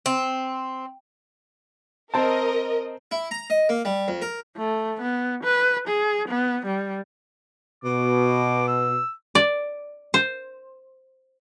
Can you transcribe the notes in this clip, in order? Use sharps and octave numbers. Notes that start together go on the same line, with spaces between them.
C4
C4 A#4 D#5 A5
E4
A#5
D#5
A#3
G3
F2
A#4
A3
B3
B4
G#4
B3
G3
B2 D6
E6
D5
C5